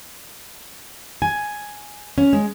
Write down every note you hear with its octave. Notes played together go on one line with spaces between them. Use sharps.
G#5
C#4
G#3